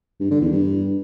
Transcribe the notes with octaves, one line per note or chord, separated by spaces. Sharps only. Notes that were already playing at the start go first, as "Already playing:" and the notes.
G2
D3
E2
G2